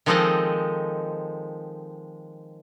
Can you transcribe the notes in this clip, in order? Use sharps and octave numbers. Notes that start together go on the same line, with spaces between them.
D#3 F3 G#3 C4 A4 D#5